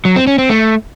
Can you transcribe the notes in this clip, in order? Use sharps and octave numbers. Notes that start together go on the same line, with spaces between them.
F#3
C4
C#4
C4
A3